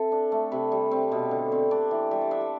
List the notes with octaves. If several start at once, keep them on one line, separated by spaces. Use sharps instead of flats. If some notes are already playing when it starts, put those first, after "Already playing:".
Already playing: C4 A4 E5
D4
A3
C3 B4
G3
C4
B2
D3
C4
D4 D5
E3
G3 E5
D5
D4 E5
A4